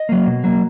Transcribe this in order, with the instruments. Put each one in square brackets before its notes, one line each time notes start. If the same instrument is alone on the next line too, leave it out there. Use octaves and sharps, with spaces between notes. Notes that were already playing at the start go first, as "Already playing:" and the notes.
Already playing: [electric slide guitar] D#5
F#3 A#3
B2
F#3 A#3